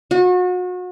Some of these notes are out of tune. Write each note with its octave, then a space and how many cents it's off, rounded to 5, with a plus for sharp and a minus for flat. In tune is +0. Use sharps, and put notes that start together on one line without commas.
F#4 -35